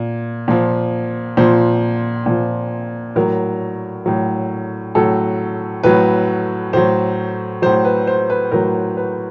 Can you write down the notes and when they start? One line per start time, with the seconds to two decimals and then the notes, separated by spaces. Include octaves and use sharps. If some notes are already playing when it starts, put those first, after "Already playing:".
Already playing: A#2
0.48 A#2 F3
1.37 A#2 F3 C5
2.26 A#2 F3
3.15 A2 F#3 A#4
4.06 A2 F#3
4.95 A2 F#3 A4
5.83 A2 F#3 B4
6.73 A2 F#3 C5
7.62 F#3 C5
7.66 A2
7.85 B4
8.07 C5
8.30 B4
8.51 A2 F#3 A#4
8.97 B4